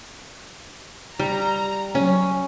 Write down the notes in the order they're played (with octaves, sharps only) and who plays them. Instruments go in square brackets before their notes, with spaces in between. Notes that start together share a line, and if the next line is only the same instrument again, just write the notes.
[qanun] G3 [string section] A#5
[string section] F#3 [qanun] C#4